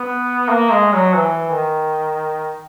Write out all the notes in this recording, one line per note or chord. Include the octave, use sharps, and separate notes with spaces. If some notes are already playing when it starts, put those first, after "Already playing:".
Already playing: B3
A#3
G#3
F#3
E3
D#3